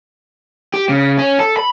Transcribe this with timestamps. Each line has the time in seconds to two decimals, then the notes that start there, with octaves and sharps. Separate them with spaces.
0.74 G4
0.89 C#3
1.18 C#4
1.39 A4
1.57 B5